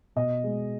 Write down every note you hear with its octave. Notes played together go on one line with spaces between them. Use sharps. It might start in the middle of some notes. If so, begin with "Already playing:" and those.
B2 D#5
G#3